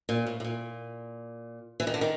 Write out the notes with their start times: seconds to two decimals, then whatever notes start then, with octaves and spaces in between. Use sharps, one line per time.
0.09 A#2
0.27 A2
0.40 A2
0.44 A#2
1.80 E3
1.87 D#3
1.94 D3
2.01 D#3